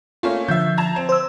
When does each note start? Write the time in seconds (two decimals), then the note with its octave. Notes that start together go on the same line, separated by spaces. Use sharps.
0.23 A3 A#3 C#4 F4
0.48 D3 F3 E5 G6
0.78 A5 A#5 G#6
0.96 C4
1.09 C5 E6